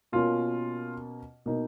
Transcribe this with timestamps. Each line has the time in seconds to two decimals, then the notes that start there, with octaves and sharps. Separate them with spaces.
0.12 B2 A#3 C#4 F4
1.46 B2 A#3 D#4